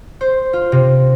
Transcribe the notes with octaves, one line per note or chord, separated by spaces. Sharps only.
C5
F4
C3